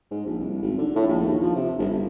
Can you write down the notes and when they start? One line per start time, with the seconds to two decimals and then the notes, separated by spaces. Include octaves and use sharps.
0.11 G#2
0.26 A#1
0.40 C2
0.62 G#1
0.79 D3
0.96 A2
1.08 A#1
1.25 D#2
1.41 F3
1.55 C3
1.78 G1
1.93 G1